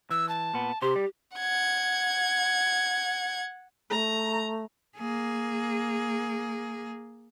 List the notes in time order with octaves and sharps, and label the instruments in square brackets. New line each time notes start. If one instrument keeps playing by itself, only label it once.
[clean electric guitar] E3 [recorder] E6
[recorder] A5
[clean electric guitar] A#2 B3
[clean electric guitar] C3 C5 [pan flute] G4
[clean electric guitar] G3
[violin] F#5 G#6
[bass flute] A3 [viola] A#5
[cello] A#3 G#4